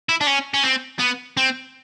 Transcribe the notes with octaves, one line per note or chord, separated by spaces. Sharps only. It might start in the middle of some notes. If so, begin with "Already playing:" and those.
E4
D4
C#4
C#4
C4
B3
C4